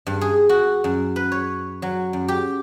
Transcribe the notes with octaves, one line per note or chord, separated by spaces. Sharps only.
G2
G#4
F#4
F#2
B4
C#5
F#3
F#2
G4